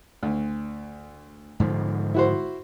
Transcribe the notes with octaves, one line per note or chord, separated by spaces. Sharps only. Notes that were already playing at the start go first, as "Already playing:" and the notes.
D2
G#2 D3 F3
E4 F#4 C5